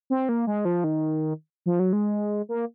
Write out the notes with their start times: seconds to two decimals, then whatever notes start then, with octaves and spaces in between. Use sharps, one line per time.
0.10 C4
0.29 A#3
0.47 G#3
0.65 F3
0.84 D#3
1.66 F3
1.79 F#3
1.93 G#3
2.49 A#3